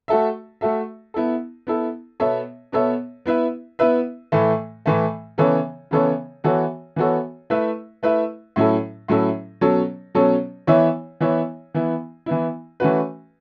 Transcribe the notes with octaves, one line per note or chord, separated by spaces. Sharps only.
A3 F#4 A4 E5
A3 F#4 A4 E5
B3 E4 A4
B3 E4 A4
B2 B3 A4 C#5 E5
B2 B3 A4 C#5 E5
B3 E4 B4 E5
B3 E4 B4 E5
A2 E3 A3
A2 E3 A3
C#3 E3 B3 A4 C#5
C#3 E3 B3 A4 C#5
E3 B3 F#4 A4 C#5
E3 B3 F#4 A4 C#5
A3 E4 B4 E5
A3 E4 B4 E5
A2 F#3 C#4 E4 A4
A2 F#3 C#4 E4 A4
B2 F#3 C#4 A4 C#5
B2 F#3 C#4 A4 C#5
E3 B3 E4 C#5 E5
E3 B3 E4 C#5 E5
E3 B3 E4
E3 B3 E4
E3 A3 C#4 F#4 B4